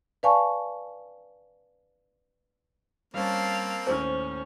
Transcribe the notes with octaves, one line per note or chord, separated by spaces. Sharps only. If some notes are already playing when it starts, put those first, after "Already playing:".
B4 D5 F5 G#5 A5 C#6
G3 A#3 C4 C#4 C5 F5 A5
D#2 A2 C#4 C5 F6